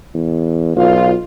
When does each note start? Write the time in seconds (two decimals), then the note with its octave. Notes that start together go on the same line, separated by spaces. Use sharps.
0.14 E2
0.76 B1 F4